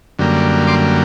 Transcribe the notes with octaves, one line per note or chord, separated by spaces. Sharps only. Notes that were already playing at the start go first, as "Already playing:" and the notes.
F#2 D3 G3 A#3
C6 D6